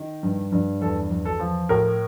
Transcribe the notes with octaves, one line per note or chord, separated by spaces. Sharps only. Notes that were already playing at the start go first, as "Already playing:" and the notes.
Already playing: D#3
G2
G2
E2 A4
E2
A4
F3
A2 A#4